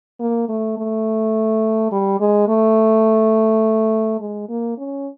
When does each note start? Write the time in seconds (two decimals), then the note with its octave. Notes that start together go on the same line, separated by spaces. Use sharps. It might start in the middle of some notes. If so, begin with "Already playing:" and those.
0.20 A#3
0.48 A3
0.77 A3
1.92 G3
2.20 G#3
2.48 A3
4.20 G#3
4.49 A#3
4.77 C#4